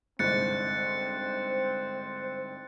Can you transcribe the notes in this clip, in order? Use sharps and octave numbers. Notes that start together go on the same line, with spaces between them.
G1 C2 G#2 C4 C5 F#6 A6 C#7